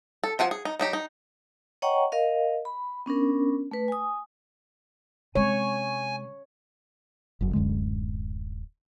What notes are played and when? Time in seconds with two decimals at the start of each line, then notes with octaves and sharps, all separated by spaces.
0.24 A4
0.39 F3 F4 F#5 G#5
0.51 G#4
0.65 D#4
0.80 F#3 D#4 G4
0.93 D#4
1.82 C#5 D#5 F#5 G5 A#5 C#6
2.12 A#4 D#5 F5
2.65 B5
3.06 B3 C#4 D4 A#4
3.71 A3 B4
3.88 G#5 D#6
5.35 C3 G#3 C#5 G#5
7.41 F#1 F#2
7.53 D1 F#2 D3 G#3